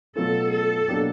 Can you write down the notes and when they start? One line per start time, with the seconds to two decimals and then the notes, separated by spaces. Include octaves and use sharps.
0.15 B2 F#3 A3 C#4 F4 A4
0.51 A4
0.88 B2 F#3 A#3 D4 G4